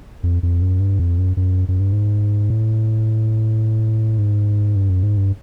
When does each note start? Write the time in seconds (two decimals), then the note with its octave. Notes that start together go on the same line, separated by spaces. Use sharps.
0.23 F2
0.43 F2
0.62 F#2
0.80 G2
0.99 F2
1.18 F#2
1.37 F#2
1.68 F#2
1.80 G2
1.93 G#2
2.50 A2
4.18 G#2
4.76 G2
4.90 F#2
5.03 G#2
5.17 G2